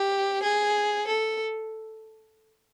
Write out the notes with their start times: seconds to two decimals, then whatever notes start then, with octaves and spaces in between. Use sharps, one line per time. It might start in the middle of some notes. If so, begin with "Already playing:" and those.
Already playing: G4
0.42 G#4
1.07 A4